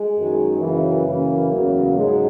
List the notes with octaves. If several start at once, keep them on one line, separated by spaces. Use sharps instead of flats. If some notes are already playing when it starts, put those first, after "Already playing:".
Already playing: G#3
F#2 D#3 F#3
F#2 C#3 E3 A#3
F#2 C#3 E3 A#3
E2 C#3 F#3
G#2 F#3 G#3